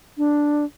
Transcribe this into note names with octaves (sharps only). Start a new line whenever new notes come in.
D4